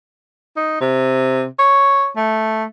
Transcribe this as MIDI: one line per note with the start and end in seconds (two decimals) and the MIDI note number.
0.56 0.77 63
0.81 1.45 48
1.59 2.08 73
2.16 2.64 57